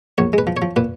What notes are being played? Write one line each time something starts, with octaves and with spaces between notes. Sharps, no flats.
A#1 C#5
G#3 B4
F3
C#5
F3
A#2 B4